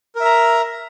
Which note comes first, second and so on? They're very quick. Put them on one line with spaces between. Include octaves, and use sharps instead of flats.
A#4 E5 A#5